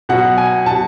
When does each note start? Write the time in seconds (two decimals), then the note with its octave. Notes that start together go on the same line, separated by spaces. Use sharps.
0.09 B2 F#3 F#5
0.38 G#5
0.66 B2 F#3 A5